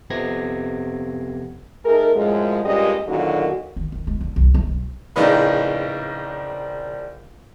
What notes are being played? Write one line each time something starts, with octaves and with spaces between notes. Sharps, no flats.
F2 C3 B3 G#6 A#6
A3 D#4 G#4 A#4
F#2 A2 F3 G#3
G2 A#2 G3 G#3 C#4 D#5
E2 A#2 D3 D#3 F#3 F#4
D#3
D#3
G#3
D3
B1
C2
B1
A#1 A2 C#3 D#4 B4